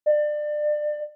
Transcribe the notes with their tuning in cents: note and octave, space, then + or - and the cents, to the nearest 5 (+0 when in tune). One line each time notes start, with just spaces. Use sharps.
D5 +30